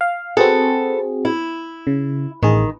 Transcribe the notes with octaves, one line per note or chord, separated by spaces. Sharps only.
F5
C4 F#4 G#4 A4 B4
E4
C#3
A1 D#3 G#4